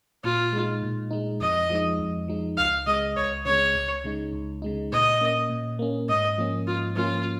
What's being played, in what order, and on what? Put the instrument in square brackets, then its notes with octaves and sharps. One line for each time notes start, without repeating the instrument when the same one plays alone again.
[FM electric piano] A#2 [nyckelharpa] F4
[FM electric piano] G#3 D#4
A#2
G#3 D#4
[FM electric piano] F2 [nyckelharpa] D#5
[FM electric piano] F3 G#3 D#4
F2
F3 G#3 D#4
[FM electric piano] C#2 [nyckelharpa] F5
[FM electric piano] C#3 G#3 [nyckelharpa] D#5
[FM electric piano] C#2 [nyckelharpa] C#5
[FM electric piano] C#3 G#3 [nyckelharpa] C#5
[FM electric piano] C#2
C#3 G#3 D#4
C#2
C#3 G#3 D#4
[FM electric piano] A#2 [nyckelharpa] D#5
[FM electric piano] A#3 C#4
A#2
A#3 C#4
[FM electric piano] G#2 [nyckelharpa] D#5
[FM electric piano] F3 A#3 C#4
[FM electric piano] G#2 [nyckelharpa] F4
[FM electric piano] F3 A#3 C#4 [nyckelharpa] F4